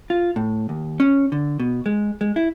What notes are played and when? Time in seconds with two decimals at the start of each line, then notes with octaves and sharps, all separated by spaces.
0.10 F4
0.36 A2
0.69 D#2
1.00 C#4
1.32 D3
1.60 B2
1.86 G#3
2.21 G#3
2.36 E4